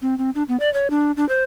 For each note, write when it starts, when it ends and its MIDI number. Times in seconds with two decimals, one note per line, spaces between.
0.02 0.17 60
0.18 0.30 60
0.35 0.43 62
0.48 0.57 59
0.60 0.72 74
0.73 0.90 73
0.90 1.12 62
1.17 1.27 62
1.29 1.44 72